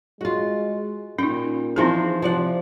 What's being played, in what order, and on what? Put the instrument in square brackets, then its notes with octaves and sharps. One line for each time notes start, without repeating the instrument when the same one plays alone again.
[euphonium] G#3 [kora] F4 F#4
[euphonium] A#2 [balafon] C#4 D#4 [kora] G5
[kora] E3 F3 C5 [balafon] C4 D#4 G#4
[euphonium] C3 [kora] F3 D5 F#5